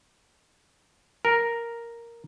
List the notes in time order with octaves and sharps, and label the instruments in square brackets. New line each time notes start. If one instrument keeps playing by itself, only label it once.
[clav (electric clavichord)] A#4